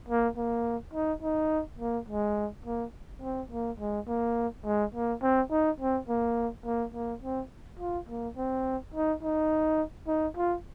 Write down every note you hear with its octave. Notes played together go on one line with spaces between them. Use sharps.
A#3
A#3
D#4
D#4
A#3
G#3
A#3
C4
A#3
G#3
A#3
G#3
A#3
C4
D#4
C4
A#3
A#3
A#3
C4
F4
A#3
C4
D#4
D#4
D#4
F4